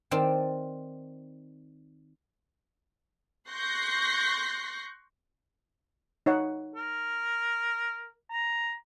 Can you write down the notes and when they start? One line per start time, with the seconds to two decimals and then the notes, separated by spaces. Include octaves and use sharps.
0.11 D#3 C4 D5 A5
3.49 C6 C#6 F#6 G6 A#6 C7
6.26 D#4 C#5 F#5
6.76 A#4
8.30 A#5